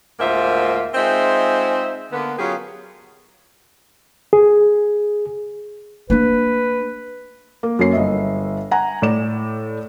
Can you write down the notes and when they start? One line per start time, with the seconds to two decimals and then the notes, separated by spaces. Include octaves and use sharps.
0.20 D2 G#2 A#3 F4 C5 E5
0.95 G#3 C4 D#4 F4 C5 E5
2.12 D3 A#3 B3
2.38 F#3 B3 C#4 F4 G4 G#4
4.33 G#4
6.10 A#3 D4 B4
7.63 A#3
7.79 F#2 A#3 C#5 C7
7.93 G1 D#5 E5
8.71 F#5 G#5 A#5
9.02 A2 D5 E7